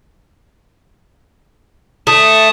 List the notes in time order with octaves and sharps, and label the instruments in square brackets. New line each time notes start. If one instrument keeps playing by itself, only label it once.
[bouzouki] A3 [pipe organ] A5 D#6